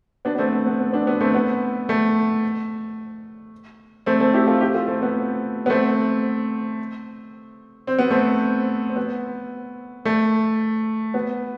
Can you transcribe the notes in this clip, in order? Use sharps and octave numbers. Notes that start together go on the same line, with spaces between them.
B3 D4
B3
A3 C4
B3
B3
B3
B3 D4
B3
A3 C4
B3
A3
A3 C4
A3 C4
E4 G4
F4 A4
E4 G4
F4 A4
A3 C4
B3
B3
A3 C4
C4
B3
A3 C4
C4
B3
A3
B3